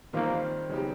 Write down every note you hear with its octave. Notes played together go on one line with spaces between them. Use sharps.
D#3 G3 A#3 C4 F4
C#3 F#3 B3 D#4 G4